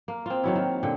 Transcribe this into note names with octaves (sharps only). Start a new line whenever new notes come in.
A#3
C4 F4
D#3 F#3 E4
D#3
A#2 D3 G4